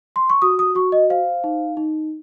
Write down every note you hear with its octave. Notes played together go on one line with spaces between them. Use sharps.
C6
C#6
F#4 D#6
D#6
F#4 C#6
D#5
C5 F5
D#4
D#4